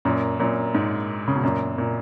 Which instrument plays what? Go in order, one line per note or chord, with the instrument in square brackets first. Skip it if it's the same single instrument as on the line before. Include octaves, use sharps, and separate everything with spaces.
[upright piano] F#2 A#2
F#2 A#2
G#2
C#3
B2
F#2 A#2
A#2